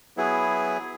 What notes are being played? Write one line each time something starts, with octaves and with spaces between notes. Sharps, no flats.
F#3 B3 E4 G#4